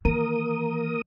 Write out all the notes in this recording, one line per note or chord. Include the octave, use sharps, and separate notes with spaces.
D#3 E3 A#3 A#4 D#6